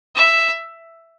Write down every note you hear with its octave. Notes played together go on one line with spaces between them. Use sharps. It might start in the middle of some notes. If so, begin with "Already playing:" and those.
E5